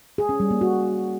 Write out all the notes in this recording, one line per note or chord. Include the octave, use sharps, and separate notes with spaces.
G#4
C#4
G3
A#3
F#4